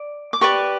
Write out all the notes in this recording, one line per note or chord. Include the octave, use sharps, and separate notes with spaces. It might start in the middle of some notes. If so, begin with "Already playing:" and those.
Already playing: D5
D6
G4 B4 D5 C#6